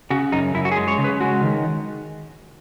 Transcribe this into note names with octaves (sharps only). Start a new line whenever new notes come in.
C#3 F#4
F#2 D#4
F#2 E4
F#4
G#4
G#3
C#5
C#3
B4
G#3 F#4
D#3